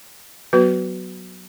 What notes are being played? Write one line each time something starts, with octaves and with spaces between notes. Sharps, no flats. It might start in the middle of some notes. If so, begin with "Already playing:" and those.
F#3 B3 F#4 B4